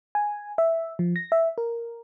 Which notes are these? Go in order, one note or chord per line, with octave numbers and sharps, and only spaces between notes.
G#5
E5
F3
A#6
E5
A#4